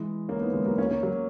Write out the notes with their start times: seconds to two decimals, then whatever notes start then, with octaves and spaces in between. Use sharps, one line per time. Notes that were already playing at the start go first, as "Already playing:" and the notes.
Already playing: E3 G#3
0.28 A#3 C#4
0.41 B3 D#4
0.53 E3 G#3
0.65 F#3 A#3
0.78 A#3 C#4
0.91 A#3 C#4
1.03 F#3 A#3